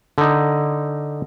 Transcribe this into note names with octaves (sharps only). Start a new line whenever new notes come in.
D3 D#4